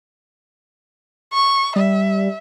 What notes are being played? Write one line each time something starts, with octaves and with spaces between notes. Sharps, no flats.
C#6
G3 E5